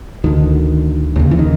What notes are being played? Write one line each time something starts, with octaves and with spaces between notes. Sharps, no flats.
D2 D3 D#3
D#2 C#3
E3
D#3